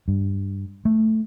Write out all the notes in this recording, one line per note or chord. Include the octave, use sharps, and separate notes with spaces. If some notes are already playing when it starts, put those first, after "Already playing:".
G2
A3